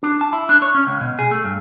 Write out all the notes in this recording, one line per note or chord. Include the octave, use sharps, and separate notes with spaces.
D4
A5
E4
D4
C#5
C#4
C#2
B2
G#4
A3
G2